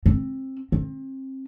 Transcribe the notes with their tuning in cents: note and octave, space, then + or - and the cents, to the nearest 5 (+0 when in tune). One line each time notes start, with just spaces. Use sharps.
C4 +20
C4 +30